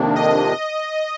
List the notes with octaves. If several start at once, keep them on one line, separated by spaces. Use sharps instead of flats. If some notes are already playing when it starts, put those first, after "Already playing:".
Already playing: F2 C3 D#3 A#3 D4
D#5